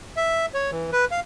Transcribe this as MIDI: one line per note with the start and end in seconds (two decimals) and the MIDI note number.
0.17 0.46 76
0.54 0.71 73
0.71 0.91 52
0.92 1.05 71
1.11 1.20 77